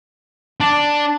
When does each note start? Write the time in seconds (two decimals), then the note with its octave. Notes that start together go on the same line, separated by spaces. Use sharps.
0.60 D4